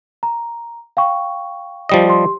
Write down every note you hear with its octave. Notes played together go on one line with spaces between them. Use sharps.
A#5
F5 G5 C#6
F3 G3 D#5
G4 C6